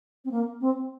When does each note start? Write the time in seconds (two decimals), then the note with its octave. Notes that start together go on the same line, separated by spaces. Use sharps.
0.25 C4
0.31 A#3
0.60 C4